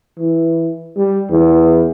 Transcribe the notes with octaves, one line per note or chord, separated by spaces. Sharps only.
E3
G3
E2